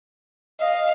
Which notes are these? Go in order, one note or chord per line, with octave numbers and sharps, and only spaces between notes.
D#5 F5